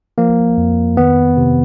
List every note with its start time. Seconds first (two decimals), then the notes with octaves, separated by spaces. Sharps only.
0.18 F3 A#3
0.57 F2
0.97 D#3 B3
1.37 C3